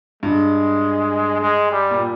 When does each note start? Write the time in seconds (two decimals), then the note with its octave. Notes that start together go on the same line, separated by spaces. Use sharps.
0.23 G2 G#3
1.41 G#3
1.71 G3
1.91 A#2